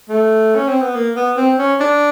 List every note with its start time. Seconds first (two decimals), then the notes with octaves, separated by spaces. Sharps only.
0.09 A3
0.55 C#4
0.68 C4
0.81 B3
0.94 A#3
1.16 B3
1.37 C4
1.59 C#4
1.80 D4